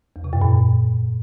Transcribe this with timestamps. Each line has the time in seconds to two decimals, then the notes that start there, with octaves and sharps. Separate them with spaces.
0.16 E2
0.24 C3
0.33 F#2
0.42 A#2